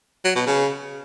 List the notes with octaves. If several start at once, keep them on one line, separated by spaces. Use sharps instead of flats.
F#3
B2
C#3